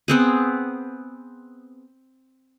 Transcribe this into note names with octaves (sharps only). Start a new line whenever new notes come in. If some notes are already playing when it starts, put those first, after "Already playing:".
B3 C4 G#4